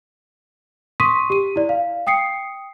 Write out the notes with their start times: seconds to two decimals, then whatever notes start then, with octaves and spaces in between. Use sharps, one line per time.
1.00 C6 C#6 D#6 B6 D#7
1.30 G4 D#7
1.56 E4 D5
1.69 F5
2.07 G5 D#6 C7 C#7